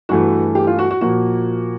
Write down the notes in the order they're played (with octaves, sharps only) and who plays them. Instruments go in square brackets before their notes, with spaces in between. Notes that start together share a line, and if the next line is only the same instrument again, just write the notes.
[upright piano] G2 E3 A3 F#4
G4
F4
F#4
F#4
A#2 F3 A#3 F#4